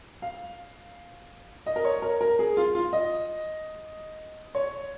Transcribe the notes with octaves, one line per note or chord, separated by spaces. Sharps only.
F5
D#5
A#4
C#5
A#4
A#4
G#4
F4
F4
D#5
C#5